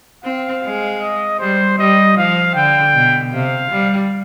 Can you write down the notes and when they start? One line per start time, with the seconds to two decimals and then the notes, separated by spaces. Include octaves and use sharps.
0.24 C4 F5
0.63 G#3
1.01 D#5
1.40 G3 C5
1.78 G3 D#5
2.16 F3 F5
2.55 D3 G5
2.94 B2
3.32 C3 F5
3.71 G3